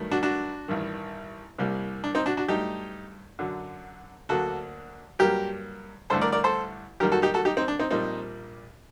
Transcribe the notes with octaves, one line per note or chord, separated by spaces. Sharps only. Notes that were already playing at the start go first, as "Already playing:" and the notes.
Already playing: G2 D#3 F#3 A3
D4 F#4
D4 F#4
A1 G2 D#3
C2 C3 G3 A#3
D4
C4 D#4
D4 F#4
D4 F#4
G2 F#3 A3 D#4 G4
F#2 D3 F#3
D2 D3 F#3 A#3 F#4 A4
G2 F#3 A#3 G4 A#4
A1 G2 D3 A3 A4 C5
A#4 D5
A#4 D5
A4 C5
F#2 D#3 G3 A#3 G4 A#4
F#4 A4
D#4 G4
F#4 A4
D#4 G4
C4 D#4
D4
C4 D#4
A#1 A#2 G3 A#3 C4 D#4